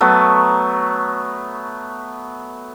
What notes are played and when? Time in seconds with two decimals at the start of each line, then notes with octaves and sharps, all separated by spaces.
0.01 F#3 A3 B3